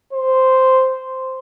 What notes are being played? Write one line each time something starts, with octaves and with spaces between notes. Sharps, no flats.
C5